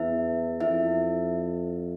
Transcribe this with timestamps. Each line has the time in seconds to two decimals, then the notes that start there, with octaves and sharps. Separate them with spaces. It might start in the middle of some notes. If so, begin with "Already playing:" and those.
Already playing: E2 E4 E5
0.60 F2 E4 E5